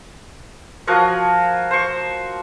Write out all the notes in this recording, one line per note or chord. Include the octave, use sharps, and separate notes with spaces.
F3 F#4 A#4 C#5
C5 C#6